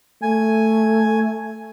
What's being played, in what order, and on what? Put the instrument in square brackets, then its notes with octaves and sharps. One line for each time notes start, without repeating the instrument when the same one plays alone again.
[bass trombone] A3 [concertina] G#5